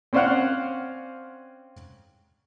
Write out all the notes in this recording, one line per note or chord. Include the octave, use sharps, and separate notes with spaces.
C4 C#4 C5 D5 F5 F#5